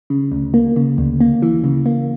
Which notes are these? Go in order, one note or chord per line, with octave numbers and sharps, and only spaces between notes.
C#3
D2
A#3
C#3
D2
A#3
E3
C#3
A#3